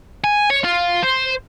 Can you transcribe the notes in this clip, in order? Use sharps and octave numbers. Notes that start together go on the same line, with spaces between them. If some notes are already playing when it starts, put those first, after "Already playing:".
G#5
C#5
F4
C5